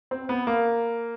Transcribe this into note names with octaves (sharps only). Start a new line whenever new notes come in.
C4
B3
A#3